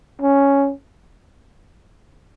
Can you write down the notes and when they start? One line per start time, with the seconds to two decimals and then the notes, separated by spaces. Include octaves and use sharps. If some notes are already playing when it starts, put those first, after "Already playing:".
0.22 C#4